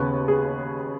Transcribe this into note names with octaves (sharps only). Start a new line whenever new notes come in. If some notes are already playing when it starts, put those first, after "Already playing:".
Already playing: D#2 C#3 B3 B4
G#4